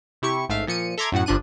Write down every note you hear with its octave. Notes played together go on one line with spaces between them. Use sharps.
C3 E4 G4 C#6 C#7
A1 G#2 A3 E5 F5
A#2 F3 C#7 D#7
A4 E5 A#5 C6 D6 G#6
F#2 A2 F#4 F#5
G1 F3 D4 F#6 D#7